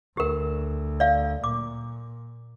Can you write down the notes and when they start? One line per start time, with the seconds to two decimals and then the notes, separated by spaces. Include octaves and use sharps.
0.17 D2 G4 A#4
1.00 D5 F5
1.44 A#2 D6